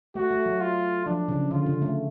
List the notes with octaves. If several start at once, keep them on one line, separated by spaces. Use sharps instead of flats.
A3 F#4
A3
F#3
F4
F3 D4
C#3
D3 F4
C#3
A3